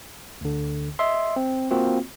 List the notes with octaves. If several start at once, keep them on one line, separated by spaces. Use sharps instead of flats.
D2 D3
D#5 E5 C6
C4
A#3 C4 F4 F#4